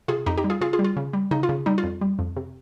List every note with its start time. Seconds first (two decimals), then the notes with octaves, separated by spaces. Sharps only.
0.08 C3 F4 G#4
0.26 F2 D#4 G4
0.37 D#4 G4
0.44 G3
0.50 F4 G#4
0.61 C#3 F4 G#4
0.73 F4 G#4
0.79 G3
0.84 F4
0.97 C#3
1.13 G3
1.31 C#3 D#4
1.43 F4
1.49 C#3
1.66 G3 D#4
1.78 F4
1.84 F2
2.01 G3
2.19 F2
2.37 C3